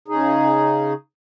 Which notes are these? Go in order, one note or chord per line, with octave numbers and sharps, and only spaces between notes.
C#3 D#4 G#4